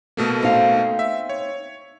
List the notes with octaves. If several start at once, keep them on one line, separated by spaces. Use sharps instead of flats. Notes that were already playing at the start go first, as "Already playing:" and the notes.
B2 A3 A#3
C4 D#4 F5
E5
C#5